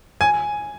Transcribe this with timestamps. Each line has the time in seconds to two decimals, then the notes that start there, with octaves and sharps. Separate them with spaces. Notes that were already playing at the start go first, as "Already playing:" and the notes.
0.21 G#5